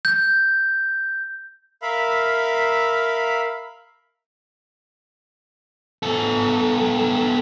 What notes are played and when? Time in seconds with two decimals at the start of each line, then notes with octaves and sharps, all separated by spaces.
0.05 G6
1.82 A#4 E5 F5 B5
6.03 B3 A4